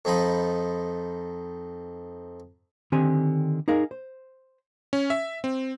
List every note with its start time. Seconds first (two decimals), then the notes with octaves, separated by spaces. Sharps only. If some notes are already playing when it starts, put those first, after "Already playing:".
0.05 F2 F3 D#4 B5
2.92 D3 D#3 C4 G4 G#5
3.68 D#4 G#4 A#4 F5
3.91 C5
4.93 C#4
5.10 E5
5.44 C4